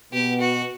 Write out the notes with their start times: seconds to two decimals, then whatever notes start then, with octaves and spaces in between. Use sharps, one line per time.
0.13 B2 B3 G4
0.41 F#4